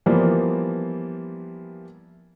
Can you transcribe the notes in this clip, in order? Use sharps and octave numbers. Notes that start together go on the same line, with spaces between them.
E3 F3 G3 A#3 B3